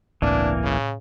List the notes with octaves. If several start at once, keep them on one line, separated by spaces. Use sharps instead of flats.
G1 C#2 A2 E3 A#3 C4 D4
C#3